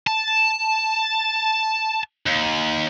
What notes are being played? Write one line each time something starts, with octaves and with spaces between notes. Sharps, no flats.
A5
D#2